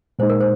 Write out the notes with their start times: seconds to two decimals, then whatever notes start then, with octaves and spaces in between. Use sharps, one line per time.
0.19 A#2 G#3 D#4 C5
0.30 A#4
0.41 C5